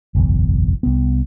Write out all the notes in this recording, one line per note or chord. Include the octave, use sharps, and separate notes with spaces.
F#1 B1 E2
C2 B3